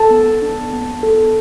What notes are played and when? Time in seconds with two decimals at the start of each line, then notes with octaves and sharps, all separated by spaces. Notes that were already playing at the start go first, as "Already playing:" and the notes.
Already playing: A4 A5
0.11 B3
0.42 D4
0.72 B3
1.03 A4